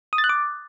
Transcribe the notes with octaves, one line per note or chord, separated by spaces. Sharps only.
D#6
A6
F#6
D6